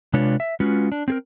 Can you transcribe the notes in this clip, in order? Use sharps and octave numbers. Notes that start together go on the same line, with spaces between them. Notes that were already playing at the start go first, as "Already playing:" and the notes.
C3 G#3 D4 F4 B4 C#5
E5
G#3 C#4 F4 F#4 B4
D4
C4 G#4 A#4